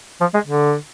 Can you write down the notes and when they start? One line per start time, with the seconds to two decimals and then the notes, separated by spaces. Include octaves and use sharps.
0.21 F3
0.34 G#3
0.46 D3